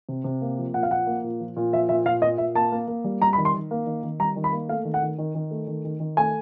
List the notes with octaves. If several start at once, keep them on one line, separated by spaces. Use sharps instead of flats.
C3
C3
A#3
F3
A#2 F#5
F5
F3 F#5
A#3
A#2
F3
A#2
F3 E5
A#2 E5
A#2 F5
A#2 D#5
A#2 E5
A#3 A5
A#3
A#3
G3
G3 A#5
B5
D#3
C6
D#3
A#3
D#3
D#3
G3 A#5
D#3
B5
A#3
A3 F5
D#3
F#5
D#3
D#3
D#3
A3
D#3
D#3
D#3
A3 G#5